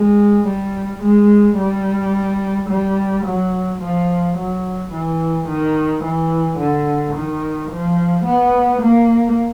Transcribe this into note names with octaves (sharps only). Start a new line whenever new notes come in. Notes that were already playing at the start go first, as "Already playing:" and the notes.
Already playing: G#3
G3
G#3
G3
G3
F#3
F3
F#3
E3
D#3
E3
D3
D#3
F3
B3
A#3